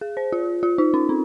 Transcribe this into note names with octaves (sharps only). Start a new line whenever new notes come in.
G#4
C5
F4
F4
D#4
C#4
C4